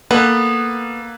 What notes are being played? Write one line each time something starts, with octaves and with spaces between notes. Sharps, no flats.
A#3 B3 A4 B4